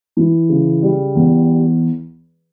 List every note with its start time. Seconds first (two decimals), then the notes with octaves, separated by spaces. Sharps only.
0.17 E3
0.49 C#3
0.83 G3
1.15 E2